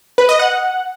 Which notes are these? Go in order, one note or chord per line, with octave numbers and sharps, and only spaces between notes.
B4
D#5
F#5